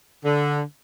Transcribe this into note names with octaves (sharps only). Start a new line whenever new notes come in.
D3